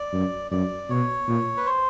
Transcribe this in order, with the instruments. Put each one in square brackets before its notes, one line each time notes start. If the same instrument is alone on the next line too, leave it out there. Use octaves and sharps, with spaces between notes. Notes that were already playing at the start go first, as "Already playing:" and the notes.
Already playing: [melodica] D5
[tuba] F#2
[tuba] F#2 [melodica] D5
[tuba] B2 [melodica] C#5
[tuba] A#2
[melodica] B4
C5